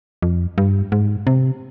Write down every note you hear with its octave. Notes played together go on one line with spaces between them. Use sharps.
F2
G2
G#2
C3